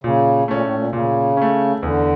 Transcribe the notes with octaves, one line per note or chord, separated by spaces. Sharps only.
A#2 C#3
A#2 A3 C#4
A2
A#2
A#2 C#3
A3 C#4
E2 D3